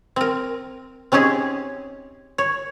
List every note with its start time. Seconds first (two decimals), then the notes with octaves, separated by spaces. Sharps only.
0.16 C4 A#4
1.12 C4 C#4 D#4 G4 G#4
2.38 C#5